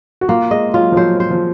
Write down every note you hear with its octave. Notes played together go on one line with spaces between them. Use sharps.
F#4
A#3 F4
G#3 D#5
F#3 F4
F3
F#3 C5
C5
F3